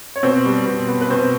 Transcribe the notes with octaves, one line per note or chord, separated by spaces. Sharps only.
C#5
B2 C4 C5
G3
B2
B3
B4
B2 C4 C5